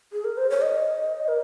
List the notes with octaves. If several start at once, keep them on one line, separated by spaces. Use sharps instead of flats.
G#4
A#4
C5
C#5
D#5
A#4